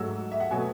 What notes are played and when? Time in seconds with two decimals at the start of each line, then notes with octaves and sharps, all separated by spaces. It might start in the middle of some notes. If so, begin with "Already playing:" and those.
Already playing: G#2 F#3 A3 E6
0.32 E5
0.40 F#5
0.51 B2 F#3 A3 G#5